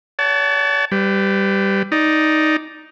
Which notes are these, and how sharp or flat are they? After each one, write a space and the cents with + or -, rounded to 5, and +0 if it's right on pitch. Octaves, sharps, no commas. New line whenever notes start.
C#5 +45 F#5 +30 A5 +0
G3 +0 B4 +35
D#4 +0 D5 +0